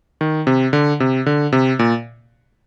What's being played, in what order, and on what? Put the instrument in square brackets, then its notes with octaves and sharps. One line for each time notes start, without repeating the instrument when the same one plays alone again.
[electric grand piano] D#3
C3
D3
C3
D3
C3
A#2